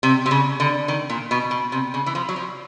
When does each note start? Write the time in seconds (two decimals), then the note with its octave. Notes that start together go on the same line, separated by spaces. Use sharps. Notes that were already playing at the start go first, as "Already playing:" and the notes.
0.03 C3
0.26 C3
0.31 C#3
0.60 D3
0.88 D#3
1.10 A#2
1.31 B2
1.51 B2
1.72 C3
1.94 C#3
2.06 E3
2.15 F3
2.29 F#3
2.36 F3